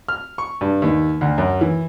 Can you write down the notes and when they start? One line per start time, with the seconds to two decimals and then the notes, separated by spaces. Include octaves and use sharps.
0.09 F6
0.38 C#6
0.61 G2
0.82 D#2
1.21 D2
1.38 F#2
1.61 E3